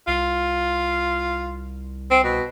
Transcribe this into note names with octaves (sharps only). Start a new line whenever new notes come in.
C2 F4
C4
B2